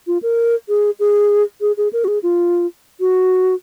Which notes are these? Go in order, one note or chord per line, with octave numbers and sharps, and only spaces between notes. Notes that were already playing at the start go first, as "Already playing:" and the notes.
F4
A#4
G#4
G#4
G#4
G#4
A#4
F#4
G#4
F4
F#4